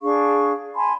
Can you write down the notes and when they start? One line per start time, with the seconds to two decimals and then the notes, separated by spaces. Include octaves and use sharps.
0.01 D4 G#4 F5 C#6
0.75 G#5 A5 B5 C6